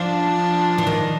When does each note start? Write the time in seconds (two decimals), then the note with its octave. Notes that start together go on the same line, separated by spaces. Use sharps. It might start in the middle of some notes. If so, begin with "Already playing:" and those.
Already playing: F3 D4
0.78 E3
0.87 D#3